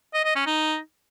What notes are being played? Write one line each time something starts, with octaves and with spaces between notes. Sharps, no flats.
D#5
D#5
C#4
D#4